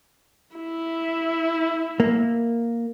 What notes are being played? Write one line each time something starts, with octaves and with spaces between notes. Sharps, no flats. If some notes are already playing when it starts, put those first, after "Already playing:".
E4
A#3